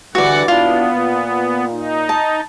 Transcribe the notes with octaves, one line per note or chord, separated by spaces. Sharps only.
G2 D3 E3 F#4 D5 F#5
B2 B3 D4 E4 F4
A#2
D#4
A5